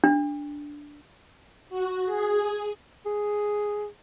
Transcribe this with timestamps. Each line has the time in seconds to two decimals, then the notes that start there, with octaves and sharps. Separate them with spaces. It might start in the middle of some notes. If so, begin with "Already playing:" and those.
0.04 D4
1.70 F#4
2.06 G#4
3.06 G#4